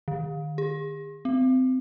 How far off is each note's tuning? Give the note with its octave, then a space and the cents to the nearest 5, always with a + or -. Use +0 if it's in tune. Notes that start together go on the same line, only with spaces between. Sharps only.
D#3 -40
G#4 -40
C4 -25